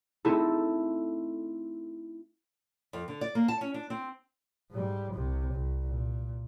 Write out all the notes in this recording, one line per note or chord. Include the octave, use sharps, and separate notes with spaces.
A3 C4 D#4 E4 A4
F2
D3
D5
A#3
A5
C#4
D4
C4
G#2 G3
C2 C3
C2
A#2